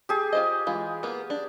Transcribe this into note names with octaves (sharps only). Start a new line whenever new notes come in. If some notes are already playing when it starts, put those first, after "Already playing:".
G4 G#4
F4 C5 D#5
E3 G#3 F4
A#3 B3
D4